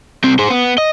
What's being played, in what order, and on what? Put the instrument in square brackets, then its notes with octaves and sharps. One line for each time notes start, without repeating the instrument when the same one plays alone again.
[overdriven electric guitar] C2 C4
G#4 C5
B3
D#5